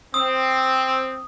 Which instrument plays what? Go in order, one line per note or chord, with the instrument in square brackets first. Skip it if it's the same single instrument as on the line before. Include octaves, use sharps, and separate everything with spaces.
[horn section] C4 [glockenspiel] D#6